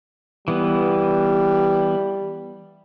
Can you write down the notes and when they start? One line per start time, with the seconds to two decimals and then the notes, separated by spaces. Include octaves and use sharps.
0.48 E3 G3 B3